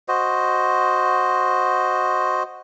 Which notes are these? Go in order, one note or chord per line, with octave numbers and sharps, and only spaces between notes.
F#4 C5 D#5